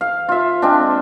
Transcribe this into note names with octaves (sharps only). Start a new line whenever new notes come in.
F5
F4 E5
G#3 C4 D4